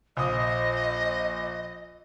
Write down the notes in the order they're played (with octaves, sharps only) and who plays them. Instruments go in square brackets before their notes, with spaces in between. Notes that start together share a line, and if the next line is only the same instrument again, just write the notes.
[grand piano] A#1 D#6 [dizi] D#5